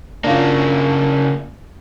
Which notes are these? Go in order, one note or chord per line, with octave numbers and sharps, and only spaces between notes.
C#3 A#3 D4 F4